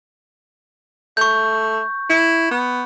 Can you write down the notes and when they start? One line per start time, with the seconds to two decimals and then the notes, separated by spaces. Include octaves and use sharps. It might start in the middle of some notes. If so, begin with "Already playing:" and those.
1.17 A3 C#6 G6
2.10 E4
2.51 B3